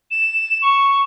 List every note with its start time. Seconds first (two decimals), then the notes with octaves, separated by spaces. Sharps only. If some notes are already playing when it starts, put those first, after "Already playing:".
0.11 E7
0.62 C#6